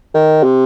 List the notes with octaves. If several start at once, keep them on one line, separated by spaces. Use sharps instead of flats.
D#3
C3